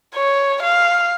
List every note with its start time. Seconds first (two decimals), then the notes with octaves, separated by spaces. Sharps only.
0.15 C#5
0.63 F5